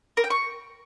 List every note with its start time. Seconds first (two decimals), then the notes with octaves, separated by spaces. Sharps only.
0.17 A#4
0.24 G5
0.30 C#6